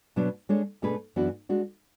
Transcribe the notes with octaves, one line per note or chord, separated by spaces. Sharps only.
B2 F#3 B3 D4
G#3 D4 A4 C#5
B2 A3 D4 G#4 B4
F#2 E3 B3 D4 F#4
G#3 D4 F#4